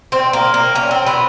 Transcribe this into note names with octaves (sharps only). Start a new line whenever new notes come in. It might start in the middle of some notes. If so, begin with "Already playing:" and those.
C4
A#3
A#3
C#4
C4
B3